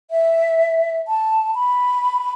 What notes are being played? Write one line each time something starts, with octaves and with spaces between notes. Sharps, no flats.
E5
A5
B5